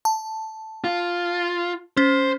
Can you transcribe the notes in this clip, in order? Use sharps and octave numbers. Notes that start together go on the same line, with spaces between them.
A5
F4
C#4 C5